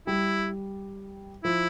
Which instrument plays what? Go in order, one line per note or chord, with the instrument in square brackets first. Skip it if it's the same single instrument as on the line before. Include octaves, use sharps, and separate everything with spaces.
[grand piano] G3 [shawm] E4
[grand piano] F3 [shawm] E4